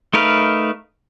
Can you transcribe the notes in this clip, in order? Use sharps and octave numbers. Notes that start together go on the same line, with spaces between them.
A3 D#4 A#4 B4 F5